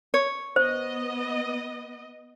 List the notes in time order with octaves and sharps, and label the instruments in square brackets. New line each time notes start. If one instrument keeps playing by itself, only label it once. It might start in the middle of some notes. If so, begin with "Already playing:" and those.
[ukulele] C#5
[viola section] B3 D#5 [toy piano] C5